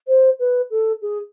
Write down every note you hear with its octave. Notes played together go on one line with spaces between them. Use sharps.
C5
B4
A4
G#4